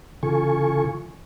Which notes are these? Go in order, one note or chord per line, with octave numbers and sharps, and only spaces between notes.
C#3 E3 F4 A4 G#5 C#6